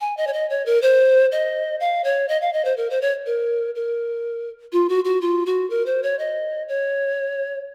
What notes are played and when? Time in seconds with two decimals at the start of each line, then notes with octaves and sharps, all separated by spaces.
0.01 G#5
0.17 D#5
0.27 C#5
0.33 D#5
0.50 C#5
0.66 A#4
0.82 C5
1.32 D#5
1.80 F5
2.04 C#5
2.29 D#5
2.41 F5
2.53 D#5
2.65 C5
2.77 A#4
2.90 C5
3.01 C#5
3.26 A#4
3.75 A#4
4.73 F4
4.89 F#4
5.05 F#4
5.21 F4
5.46 F#4
5.70 A#4
5.86 C5
6.03 C#5
6.19 D#5
6.68 C#5